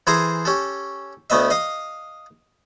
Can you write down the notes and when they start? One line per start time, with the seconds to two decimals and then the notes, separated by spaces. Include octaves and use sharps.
0.07 E3 G#4 A4 C5 G#5 A#5
0.45 C#4 G4 A4
1.30 D2 A3 B3 D#5 E5
1.50 D#5 F5 D#6